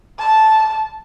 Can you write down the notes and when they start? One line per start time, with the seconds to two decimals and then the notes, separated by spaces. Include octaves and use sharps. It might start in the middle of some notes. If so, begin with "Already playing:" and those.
0.19 A5